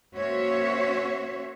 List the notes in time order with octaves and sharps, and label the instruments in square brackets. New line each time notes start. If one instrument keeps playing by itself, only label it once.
[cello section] A#3 C#4 F#4 C5 C#5 E5